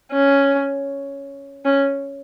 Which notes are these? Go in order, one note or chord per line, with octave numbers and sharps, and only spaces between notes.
C#4
C#4